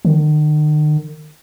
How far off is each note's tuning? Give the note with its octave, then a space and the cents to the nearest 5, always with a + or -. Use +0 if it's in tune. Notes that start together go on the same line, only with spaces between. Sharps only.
D#3 -45